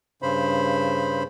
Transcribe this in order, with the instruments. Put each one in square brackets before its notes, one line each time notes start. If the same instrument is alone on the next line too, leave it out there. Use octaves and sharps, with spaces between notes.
[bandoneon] G2 C#3 C5 B5